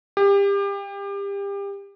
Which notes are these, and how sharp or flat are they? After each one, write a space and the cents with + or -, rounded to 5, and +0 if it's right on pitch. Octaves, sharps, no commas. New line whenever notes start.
G4 +30